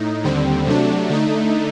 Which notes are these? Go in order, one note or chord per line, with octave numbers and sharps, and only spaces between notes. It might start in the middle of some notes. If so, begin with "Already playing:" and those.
Already playing: A2 D#4
D#2 D3 G3 C4
C3 F#3 A3 D4
D3 A3 D#4